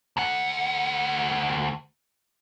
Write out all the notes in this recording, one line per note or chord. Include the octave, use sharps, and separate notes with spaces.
D2 F#5